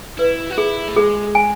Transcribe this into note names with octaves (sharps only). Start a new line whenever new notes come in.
E4 B4
F#4
E4 G#4
A3
G#3 G#4
G#5